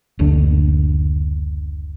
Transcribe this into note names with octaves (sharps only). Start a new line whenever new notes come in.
F#1 D2 D3 D4